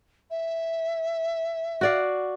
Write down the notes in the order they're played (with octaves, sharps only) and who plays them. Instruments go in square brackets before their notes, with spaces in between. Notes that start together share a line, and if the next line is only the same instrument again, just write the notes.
[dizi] E5
[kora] F#4 D5 F5